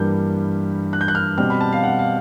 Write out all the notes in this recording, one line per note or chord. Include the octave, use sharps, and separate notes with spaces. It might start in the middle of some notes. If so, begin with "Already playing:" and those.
Already playing: G2 E3 G3 A#3 G6
F#6
G6
F#6
F6
B2 G3 C4 F6
B5
A5
F5
F#5
F5